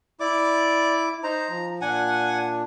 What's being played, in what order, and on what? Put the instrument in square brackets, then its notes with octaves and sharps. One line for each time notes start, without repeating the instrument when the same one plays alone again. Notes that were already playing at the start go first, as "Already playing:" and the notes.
[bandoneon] E4 D6 [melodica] D5
[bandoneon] D#4 C5 [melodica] A#5
[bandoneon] F3
[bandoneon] A#2 D4 [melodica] F#5 G#5